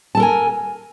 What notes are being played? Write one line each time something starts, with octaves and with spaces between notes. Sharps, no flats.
A4 A#4 G#5 A5